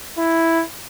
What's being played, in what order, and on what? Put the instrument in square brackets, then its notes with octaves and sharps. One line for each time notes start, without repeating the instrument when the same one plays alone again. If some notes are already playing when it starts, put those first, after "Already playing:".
[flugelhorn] E4